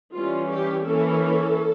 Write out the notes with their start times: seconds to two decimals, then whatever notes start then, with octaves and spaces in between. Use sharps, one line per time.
0.13 E3 G3 C#4 F4
0.49 G4
0.85 E3 A#3 C#4 A4